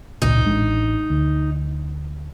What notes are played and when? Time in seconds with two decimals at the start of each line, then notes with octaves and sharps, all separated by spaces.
0.22 G#1 C#2 A#2 D#4
0.45 A1 G#3 D4
1.10 D2